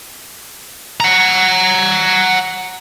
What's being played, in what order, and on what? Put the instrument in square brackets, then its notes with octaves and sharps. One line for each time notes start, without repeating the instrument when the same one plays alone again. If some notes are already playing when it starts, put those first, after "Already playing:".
[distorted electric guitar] F#5 A#5